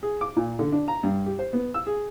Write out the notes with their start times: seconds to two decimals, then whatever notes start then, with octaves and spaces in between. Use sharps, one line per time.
0.03 G#4
0.21 D6
0.37 A#2
0.59 D3
0.72 D4
0.88 A#5
1.03 G2
1.26 G4
1.39 C5
1.53 B3
1.74 E6
1.87 G#4